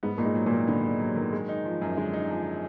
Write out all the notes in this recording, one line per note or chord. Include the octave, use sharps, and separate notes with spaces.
G#2 B3
A#2 D#4
G#2
F#3
A#2
D#3
D3 B3
D#4
F#3
D#3
G#3
D#4
F3
F#2
D3 G#3
D#4
F3